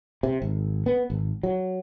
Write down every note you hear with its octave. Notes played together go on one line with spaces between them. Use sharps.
C3
G#1
B3
G#1
F#3